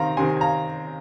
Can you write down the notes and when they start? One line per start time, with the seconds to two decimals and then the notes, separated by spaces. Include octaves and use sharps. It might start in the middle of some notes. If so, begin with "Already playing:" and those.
Already playing: C3 D#3 C4 F5 A#5 C6
0.17 C3 D#3 C4 G#5 C6
0.37 G#5
0.41 F5 A#5